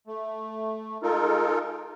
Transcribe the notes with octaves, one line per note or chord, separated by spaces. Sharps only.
A3
G#3 D#4 F4 A4 A#4